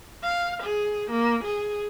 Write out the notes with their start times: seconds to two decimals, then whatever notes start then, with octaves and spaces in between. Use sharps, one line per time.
0.23 F5
0.62 G#4
1.10 A#3
1.44 G#4